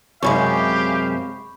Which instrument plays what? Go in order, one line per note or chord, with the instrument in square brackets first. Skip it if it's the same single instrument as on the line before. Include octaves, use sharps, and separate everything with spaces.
[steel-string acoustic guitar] F#2 C3 G#3 [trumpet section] G4 F5 [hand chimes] B5 C#6